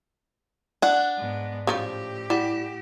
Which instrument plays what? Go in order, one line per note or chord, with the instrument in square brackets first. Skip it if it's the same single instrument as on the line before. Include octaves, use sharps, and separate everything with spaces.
[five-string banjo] D4 F#5 [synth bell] D5
[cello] G#2 B3
[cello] A2 G4 [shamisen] C#3 F3
[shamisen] G3 [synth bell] E4 F#5